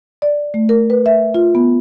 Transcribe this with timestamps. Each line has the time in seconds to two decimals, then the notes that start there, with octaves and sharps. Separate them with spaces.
0.22 D5
0.54 A3
0.69 A#4
0.90 B4
1.06 E5
1.34 F4
1.55 B3